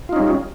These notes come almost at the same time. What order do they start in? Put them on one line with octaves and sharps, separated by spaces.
F4 D#4 C#4 G3